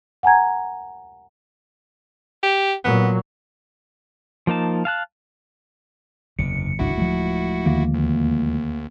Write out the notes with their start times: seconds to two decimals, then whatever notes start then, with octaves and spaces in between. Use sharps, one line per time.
0.23 F#5 G#5 A#5 G#6
2.43 G4
2.84 A#2 F#3 B3
4.47 F3 A#3 D#4 A5
4.85 F5 A5 F#6
6.39 F#1 E2 C3 C#7
6.79 D1 G#1 C#2 D4 E4 F#4
6.98 F3 G#3 A3
7.66 D#2 D3 D#3 A#3
7.94 D2